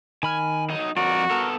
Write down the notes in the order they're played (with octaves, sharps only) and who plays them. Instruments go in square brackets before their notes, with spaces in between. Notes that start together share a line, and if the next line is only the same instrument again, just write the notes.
[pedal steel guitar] D#3 B5 F6 [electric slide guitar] G#5
[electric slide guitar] F#3 D#4 D#5
[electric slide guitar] F2 A#4 [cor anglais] F#4 [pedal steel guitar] D5
[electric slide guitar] B3 A4 [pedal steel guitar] A#4